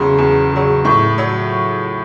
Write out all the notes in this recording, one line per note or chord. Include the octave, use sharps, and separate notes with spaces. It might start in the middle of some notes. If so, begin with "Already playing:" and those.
Already playing: E2 C#3 F#3 C6
E2
C#3 F#3
A2 C#6
F#3